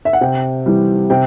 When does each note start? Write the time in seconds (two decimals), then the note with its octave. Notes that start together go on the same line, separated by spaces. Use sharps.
0.05 E5
0.13 F#5
0.21 C3 G5
0.66 E3 G3
1.10 C3 G5